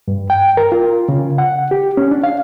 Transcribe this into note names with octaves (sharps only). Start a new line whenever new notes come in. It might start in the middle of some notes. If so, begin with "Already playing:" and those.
G2
G5
A#4
F4
C#3
F#5
G4
C#4
D4
F5